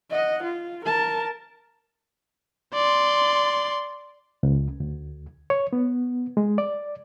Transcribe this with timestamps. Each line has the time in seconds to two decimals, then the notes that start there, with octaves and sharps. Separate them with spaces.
0.11 D#5 F#5
0.43 F4
0.85 A#4 A5
2.74 D5 C6
4.43 C#2
4.80 D2
5.50 C#5
5.73 B3
6.37 G#3
6.58 D5